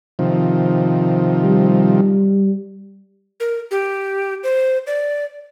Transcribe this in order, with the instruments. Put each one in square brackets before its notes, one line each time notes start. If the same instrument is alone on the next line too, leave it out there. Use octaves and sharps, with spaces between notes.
[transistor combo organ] C3 D#3 F3
[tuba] G3
[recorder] A#4
G4
C5
D5